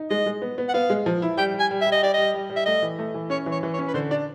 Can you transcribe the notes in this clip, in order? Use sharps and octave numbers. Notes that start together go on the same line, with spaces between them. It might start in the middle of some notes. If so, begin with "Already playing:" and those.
Already playing: D#4
G#3 D#5
G#3
B3
B3
F#5
B3 F5
G#3
F3
E4
G3 G5
G3
G#5
G3
E5
G3
D#5
G4 D5
G3 D#5
G3
G3
E5
A3 D#5
E3
A3
E3
C#4 C#5
E3
C#5
E3
C#5
C#4
B4
D3 C5
D4 D5